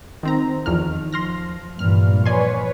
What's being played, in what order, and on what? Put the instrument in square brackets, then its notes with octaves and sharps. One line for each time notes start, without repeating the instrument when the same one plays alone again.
[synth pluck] D#3 C4 A#5
[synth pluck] E2 F3 F6 [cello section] D#3
[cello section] F3 [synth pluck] C6 F6 A#6
[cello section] G2 A#2 E3 [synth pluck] F6
[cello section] F3 B4 C#5 [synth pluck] D5 G#5 C6